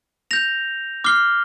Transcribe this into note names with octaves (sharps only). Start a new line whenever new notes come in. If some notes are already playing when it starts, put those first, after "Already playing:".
G6 A#6 F7
D6 F6 C7 G7